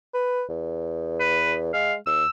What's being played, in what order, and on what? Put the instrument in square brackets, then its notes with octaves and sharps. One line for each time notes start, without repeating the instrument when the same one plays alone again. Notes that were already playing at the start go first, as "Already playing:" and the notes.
[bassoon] B4
E2
[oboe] B4
[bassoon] G#3 [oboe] F5
[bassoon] D#2 [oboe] E6